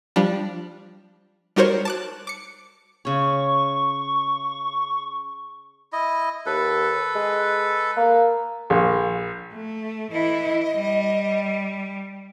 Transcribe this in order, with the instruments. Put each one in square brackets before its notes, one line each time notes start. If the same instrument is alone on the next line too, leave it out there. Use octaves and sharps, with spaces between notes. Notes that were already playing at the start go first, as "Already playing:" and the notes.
[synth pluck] F3 G3 D4
G3 D#4 F#4 A#4 C5 C#5
A5 D6 F#6
D6 C#7
[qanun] C#3 C#5 [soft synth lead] C#6
[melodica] E4 D#5
[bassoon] D#2 [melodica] A4 B4
[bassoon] G#3
A#3
[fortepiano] A#1
[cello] A3
[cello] E3 E4 [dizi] D#5
[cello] G3